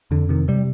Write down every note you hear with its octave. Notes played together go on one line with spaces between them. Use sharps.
F2 D3
C3 D#3
C3 G3